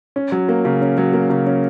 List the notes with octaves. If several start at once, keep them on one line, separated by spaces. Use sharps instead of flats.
C#4
F#3
A#3
C#3
C#4
F#3
A#3
C#3
C#4